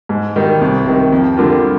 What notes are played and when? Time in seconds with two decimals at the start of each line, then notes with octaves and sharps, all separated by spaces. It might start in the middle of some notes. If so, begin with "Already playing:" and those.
0.09 G#2
0.36 D#3 G3
0.61 C2
0.86 C3 D#3
1.12 F2
1.37 D3 G3 A#3 F4